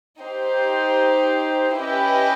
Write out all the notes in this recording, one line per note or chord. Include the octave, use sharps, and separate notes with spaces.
D#4 G4 C5
C#4 E4 G4 B4 D#5